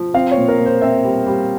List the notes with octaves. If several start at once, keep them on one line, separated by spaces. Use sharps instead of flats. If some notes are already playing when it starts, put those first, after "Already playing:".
Already playing: F3
C4 F5
C#5
A#2
A#4
A#2
C5
C4 E5
G3
G3